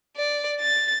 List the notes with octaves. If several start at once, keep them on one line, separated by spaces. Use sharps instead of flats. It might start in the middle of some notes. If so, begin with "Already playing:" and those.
D5
A6